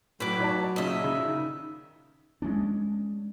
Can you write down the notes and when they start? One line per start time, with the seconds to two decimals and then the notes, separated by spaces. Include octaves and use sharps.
0.20 A2 F#3 B4 D5 D6
0.40 D#4 C#5 A5
0.76 A#2 C#3 D#5 E5
1.04 C#3
1.25 D#3
2.42 G#3 A3 C#4 D4